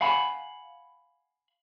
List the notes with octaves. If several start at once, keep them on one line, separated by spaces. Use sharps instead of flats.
F5 F#5 G#5 B5